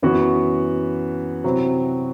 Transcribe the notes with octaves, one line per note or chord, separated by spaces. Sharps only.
F#2 E3 B3 F#4
C3 F#3 C4 E4